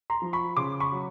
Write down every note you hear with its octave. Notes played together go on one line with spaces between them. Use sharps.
A#5 C6
F3
B5 C#6
C#3 C6 D6
B5 C#6
F#3